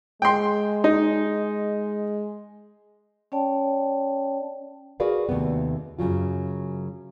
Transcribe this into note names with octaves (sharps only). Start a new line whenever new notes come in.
G#3 G5 C6
D#4
C#4 C#5 D5 G5 A5
F#4 G#4 A#4 B4 D5 F5
D#2 C3 A3 B3
F#2 C#3 F#3 F4